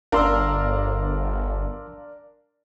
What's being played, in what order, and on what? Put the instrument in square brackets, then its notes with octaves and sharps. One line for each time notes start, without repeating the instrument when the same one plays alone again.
[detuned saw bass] G1 [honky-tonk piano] D4 A#4 [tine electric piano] F5 C6 E6